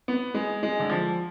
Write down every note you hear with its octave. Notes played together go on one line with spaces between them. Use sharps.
B3
G#3
G#3
D3
F3